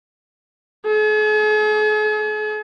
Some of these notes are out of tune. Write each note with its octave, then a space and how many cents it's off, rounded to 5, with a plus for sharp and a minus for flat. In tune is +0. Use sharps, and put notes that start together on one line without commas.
G#4 +45